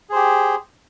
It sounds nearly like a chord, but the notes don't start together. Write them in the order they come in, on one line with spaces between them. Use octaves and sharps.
G#4 C5 G4